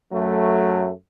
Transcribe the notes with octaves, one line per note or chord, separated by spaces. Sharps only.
F#2 F#3 A3